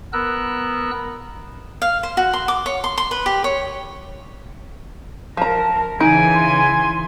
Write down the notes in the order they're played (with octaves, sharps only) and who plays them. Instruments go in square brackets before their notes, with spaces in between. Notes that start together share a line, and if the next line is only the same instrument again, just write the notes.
[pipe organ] B3 A#4 E6 F#6
[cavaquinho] F5
C5
F#4
C6
D6
C#5
C6
C6
B4
G4
C#5
[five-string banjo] F3 A#5 [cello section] A#4 [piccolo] A5
[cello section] C#3 E3 [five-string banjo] D#4 [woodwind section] G#5 [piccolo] D7
[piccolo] C6